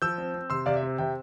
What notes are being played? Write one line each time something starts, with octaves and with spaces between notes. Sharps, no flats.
F3 E6 G6
C4
C4
C3 C6 E6
C3 D5 F5
E5
C4
C3 E5 G5